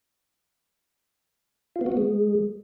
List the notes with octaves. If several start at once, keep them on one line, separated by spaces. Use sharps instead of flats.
F4
B3
F#4
B3
G#3